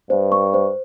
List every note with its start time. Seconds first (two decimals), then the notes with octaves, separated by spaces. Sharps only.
0.10 G2 C5
0.32 C#6
0.54 C5